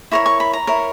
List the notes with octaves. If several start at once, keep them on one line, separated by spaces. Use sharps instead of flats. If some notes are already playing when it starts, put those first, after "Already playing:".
E4 A#4 C#5 C#6
C#6
B5
A#5
E4 A#4 C#5